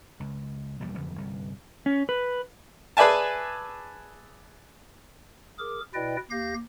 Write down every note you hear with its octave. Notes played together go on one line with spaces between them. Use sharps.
C#2
A#1 E2 B2 G3
F#1 F2 D3
G1 C2
C#4
B4
G#4 B4 D5 E5 G#5 A5
G#4 A#4 D6
B2 E4 B4 D5 D#5 G5
D#2 G4 F5 G6 A#6